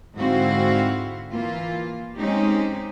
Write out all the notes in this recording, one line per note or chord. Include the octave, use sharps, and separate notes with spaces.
G#2 D3 C4 E4 F#4 F5
E3 A#3 F4
G#3 C4 C#4 D#4 G4